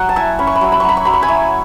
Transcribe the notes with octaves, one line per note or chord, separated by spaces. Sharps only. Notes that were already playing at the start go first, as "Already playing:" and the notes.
Already playing: F#3 F#5
A5
E4 E5 G#5
C#4 B5
C#6
B5
F#3 C#6
B5
F#3 C#6
B5
C#6
F#3 B5
C#6
G#5 B5
E4